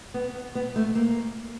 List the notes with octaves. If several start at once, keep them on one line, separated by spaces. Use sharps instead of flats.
B3
B3
A3
A#3